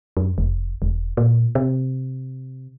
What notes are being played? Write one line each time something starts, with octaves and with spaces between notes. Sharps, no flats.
F#2
F1
E1
A#2
C3